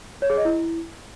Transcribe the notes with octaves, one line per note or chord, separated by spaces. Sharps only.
C#5
G#4
D#5
E4